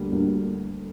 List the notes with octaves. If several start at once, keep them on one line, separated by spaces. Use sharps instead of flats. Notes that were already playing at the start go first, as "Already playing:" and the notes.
Already playing: D2 D3 G3 A#3
D2 D3 G3 A#3